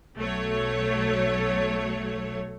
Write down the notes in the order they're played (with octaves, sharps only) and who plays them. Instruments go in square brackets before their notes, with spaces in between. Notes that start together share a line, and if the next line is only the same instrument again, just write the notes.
[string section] B1 F#3 A3 C#5